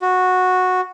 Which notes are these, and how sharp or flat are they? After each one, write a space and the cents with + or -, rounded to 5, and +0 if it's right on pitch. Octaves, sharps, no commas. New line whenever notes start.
F#4 -10